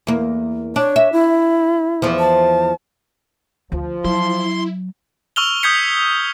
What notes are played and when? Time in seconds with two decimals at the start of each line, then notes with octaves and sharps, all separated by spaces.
0.07 E2 A#3
0.76 D4 C#5
0.96 E5
1.13 E4
2.02 E2 F3
2.19 A5
3.72 D2 F3
4.04 F#3 E4 C6
5.36 C#6 E6 F6 F7 G7
5.63 D#6 G6 G#6 B6 C#7